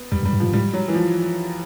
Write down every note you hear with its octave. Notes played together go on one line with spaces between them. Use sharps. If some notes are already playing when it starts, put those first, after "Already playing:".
Already playing: B3
E2 G3
F2
G3
G2
G#2 F3
A2 G3
F#3
E3
F3